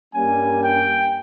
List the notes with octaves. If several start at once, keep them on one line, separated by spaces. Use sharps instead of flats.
G2 G3 A#3 C#4 G#5
G5